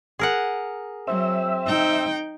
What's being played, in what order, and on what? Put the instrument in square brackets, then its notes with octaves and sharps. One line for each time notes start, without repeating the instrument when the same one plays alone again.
[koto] G#4 A#4 F#5
[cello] F#3 [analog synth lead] C4 [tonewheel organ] E5
[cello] D#4 G5